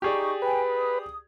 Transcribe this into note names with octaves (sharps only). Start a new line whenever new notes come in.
D#4 G4 G#4 D5 C#6
B4 G5 G#5
D#6